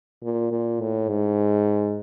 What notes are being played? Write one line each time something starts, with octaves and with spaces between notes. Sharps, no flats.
A#2
A#2
A2
G#2